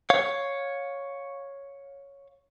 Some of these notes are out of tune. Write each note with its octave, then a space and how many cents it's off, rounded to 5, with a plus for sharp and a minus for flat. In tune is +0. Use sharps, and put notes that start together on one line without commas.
C#5 +0 F5 +20